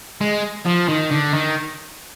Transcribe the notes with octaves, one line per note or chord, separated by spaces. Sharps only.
G#3
F3
D#3
D3
D#3